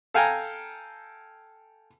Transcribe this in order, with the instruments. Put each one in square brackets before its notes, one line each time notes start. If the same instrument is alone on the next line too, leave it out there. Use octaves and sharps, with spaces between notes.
[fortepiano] A4 F5 G5 G#5 A#5